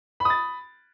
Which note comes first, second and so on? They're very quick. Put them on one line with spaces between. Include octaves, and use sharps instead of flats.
B5 D#6 A6